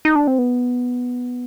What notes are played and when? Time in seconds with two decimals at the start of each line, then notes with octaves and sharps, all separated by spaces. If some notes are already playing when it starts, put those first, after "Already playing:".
0.05 D#4
0.16 D4
0.27 C4
0.38 B3